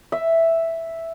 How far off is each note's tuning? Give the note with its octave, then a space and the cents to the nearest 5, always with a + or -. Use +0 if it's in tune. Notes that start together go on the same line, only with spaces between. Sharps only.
E5 +0